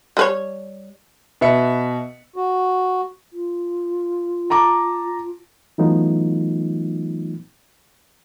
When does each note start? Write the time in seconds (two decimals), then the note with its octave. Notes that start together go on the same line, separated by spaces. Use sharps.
0.17 G3 B4 C#5
1.41 B2 B4 E5 C#7
2.36 F#4
3.33 F4
4.50 A5 A#5 D6
5.78 E3 F#3 A3 B3 D#4 F4